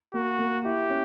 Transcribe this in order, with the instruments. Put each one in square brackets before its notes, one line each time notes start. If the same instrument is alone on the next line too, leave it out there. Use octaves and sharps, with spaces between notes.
[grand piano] A#3 [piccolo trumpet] F#4
[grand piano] A#3
[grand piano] E4 [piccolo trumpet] G4
[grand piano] C#4